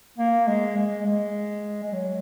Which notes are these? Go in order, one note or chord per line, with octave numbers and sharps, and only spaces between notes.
A#3
G#3
G#3
G#3
G#3
F#3